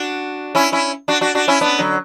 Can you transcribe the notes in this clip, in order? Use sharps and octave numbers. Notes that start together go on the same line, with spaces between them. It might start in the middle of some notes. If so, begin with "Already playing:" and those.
Already playing: D4 F#4
C#4 E4
C#4 E4
D4 F#4
D4 F#4
D4 F#4
C#4 E4
B3 D4
D3 F#3